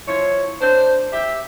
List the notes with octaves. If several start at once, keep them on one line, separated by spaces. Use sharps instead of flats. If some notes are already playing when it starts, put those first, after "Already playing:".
F3 C4 E4 C#5
D4 C5
G4 E5